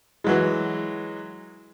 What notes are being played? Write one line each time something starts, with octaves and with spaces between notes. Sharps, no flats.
E3 F#3 G#3